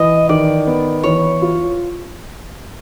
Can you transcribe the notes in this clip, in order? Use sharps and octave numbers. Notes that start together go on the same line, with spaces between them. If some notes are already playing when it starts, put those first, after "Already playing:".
Already playing: E3 D#5
D#3 D5
B3
E3 C#5
F4